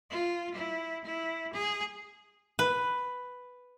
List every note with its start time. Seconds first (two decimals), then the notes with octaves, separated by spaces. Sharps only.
0.10 F4
0.55 E4
1.04 E4
1.53 G#4
2.59 B4